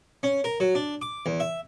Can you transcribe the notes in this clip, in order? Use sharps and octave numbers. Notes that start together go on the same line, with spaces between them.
C#4
A#4
F#3
D4
D6
E2
E5